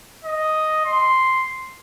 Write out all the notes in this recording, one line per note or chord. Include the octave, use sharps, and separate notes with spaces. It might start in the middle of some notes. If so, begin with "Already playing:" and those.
D#5
C6